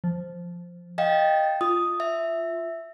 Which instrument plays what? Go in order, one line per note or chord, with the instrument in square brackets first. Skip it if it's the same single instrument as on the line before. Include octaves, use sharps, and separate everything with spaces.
[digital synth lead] F3
[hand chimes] D#5 F5 G5 [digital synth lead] A6
[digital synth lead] F4 [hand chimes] D#6
[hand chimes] E5